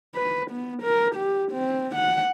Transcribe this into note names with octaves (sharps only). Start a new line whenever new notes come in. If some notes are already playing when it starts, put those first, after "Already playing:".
B4
B3
A#4
G4
C4
F#5